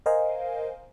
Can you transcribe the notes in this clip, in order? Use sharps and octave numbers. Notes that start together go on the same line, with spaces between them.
A#4 C5 D#5 F5 G#5